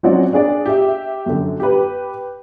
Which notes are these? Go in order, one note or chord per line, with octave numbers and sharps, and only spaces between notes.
F#3 C4 C#4 D#4 F#4 D5
D4 G#4 D5
G4 E5
F#2 D3
G4 B4